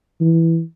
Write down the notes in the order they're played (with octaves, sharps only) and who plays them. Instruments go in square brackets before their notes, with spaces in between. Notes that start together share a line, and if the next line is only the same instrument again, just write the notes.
[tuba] E3